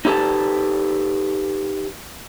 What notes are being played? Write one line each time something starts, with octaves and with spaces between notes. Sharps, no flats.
D#4 E4 G4 A4 B4 A5